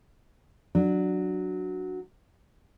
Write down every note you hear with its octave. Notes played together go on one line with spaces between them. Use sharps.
F#3 D4